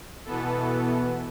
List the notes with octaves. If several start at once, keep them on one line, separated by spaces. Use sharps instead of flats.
B2 E3 B3 A4